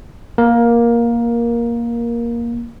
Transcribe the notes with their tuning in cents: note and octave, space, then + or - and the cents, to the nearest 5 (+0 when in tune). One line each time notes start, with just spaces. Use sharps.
A#3 +10 A#4 +15